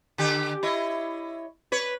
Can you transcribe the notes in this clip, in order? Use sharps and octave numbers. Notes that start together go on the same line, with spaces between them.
D3 G4
E4 C#5 D#5
B4 C#5